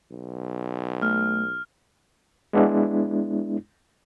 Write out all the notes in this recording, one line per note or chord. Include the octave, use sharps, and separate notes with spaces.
B1
A3 F6
G#3 B3 D4 E4